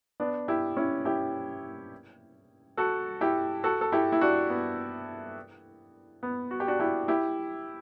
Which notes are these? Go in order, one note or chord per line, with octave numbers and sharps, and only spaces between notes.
B3 D4
E4 G4
C#4 E4
E4 G4
F#4 A4
E4 G4
F#4 A4
A4
E4 G4
E4
D4 F#4
B3
B3
F#4
G4
D4 F#4
E4 G4
E4 G4